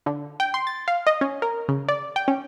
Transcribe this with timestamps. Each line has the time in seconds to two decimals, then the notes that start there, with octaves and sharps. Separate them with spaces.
0.06 D3
0.40 G5
0.54 C6
0.67 A6
0.88 F5
1.07 D#5
1.21 C#4
1.42 A#4
1.68 C#3
1.89 D5
2.16 G5
2.28 C#4